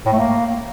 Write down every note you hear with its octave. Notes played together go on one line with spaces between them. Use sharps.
A2
A3
A#3